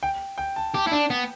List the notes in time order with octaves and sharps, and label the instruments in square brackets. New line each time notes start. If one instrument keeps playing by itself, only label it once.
[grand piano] G5
G5
A5
[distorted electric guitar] G4 [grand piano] A5
[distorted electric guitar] E4
D4
B3